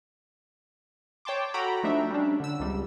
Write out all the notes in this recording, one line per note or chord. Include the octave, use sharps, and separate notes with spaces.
C#5 G5 A5 C6 D6
F#4 A4 G5 A#5 B5
F3 A3 D4 D#4 E5
G3 C#4 D4
D3 E6
C#2 C3 G3